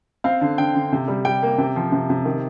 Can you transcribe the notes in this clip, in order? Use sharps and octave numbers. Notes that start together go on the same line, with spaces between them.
C4 F5
D3
D3 G5
D3
C3
G3
G3 G5
A#3
C3
F3
C3
C3
D#3